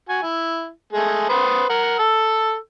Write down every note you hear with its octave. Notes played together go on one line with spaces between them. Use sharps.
F#4 G#5
E4
G#3 A3 G#4
B4 C5 D#6
A#4 F#5
A4 E6